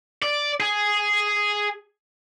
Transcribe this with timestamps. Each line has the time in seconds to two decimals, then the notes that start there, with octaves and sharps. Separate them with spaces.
0.22 D5
0.60 G#4